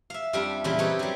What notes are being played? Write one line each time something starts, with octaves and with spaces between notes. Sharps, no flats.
E5 F5
F2 G3 D4 E5 F5
E2 A#2 C#3 G3 E4
C4 D#4 G4 A4 B4 C#5
F#3 G3